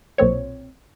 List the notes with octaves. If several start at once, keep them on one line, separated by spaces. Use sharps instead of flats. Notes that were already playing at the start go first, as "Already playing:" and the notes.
B1 A#2 C4 C#5